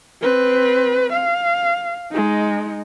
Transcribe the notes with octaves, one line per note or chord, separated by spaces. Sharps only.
C4 B4
F5
G#3 D#4